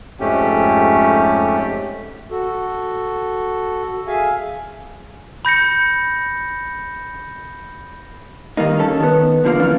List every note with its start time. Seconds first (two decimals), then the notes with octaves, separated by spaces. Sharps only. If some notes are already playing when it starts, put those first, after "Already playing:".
0.20 F2 G#2 A3 C#4 G4
2.31 F#4 A4
4.07 G#4 E5 F5 G#5
5.45 B5 G6 A#6 C#7
8.57 D#3 G3 A#3 D#4
8.79 C#4 A4
9.00 D#3 B3
9.44 E2 D3 F3 G3 A#3
9.60 F#2 E3 A#3 C#4 D4